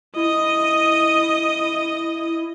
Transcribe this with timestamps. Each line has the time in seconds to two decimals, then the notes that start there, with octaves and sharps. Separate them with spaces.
0.16 E4 D#5